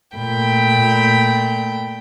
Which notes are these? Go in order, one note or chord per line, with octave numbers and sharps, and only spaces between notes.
A#2 A3 G5 B5